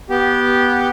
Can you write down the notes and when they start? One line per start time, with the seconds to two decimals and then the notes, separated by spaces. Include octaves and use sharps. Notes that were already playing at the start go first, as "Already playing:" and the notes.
0.10 B3 G4